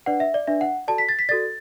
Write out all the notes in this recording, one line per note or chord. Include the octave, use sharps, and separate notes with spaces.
D4 B4 D5 F#5
E5
D5
D4 B4 D5 E5
F#5
F#4 A4 D5 A5
B6
A6
B6
F#4 A4 D5 A6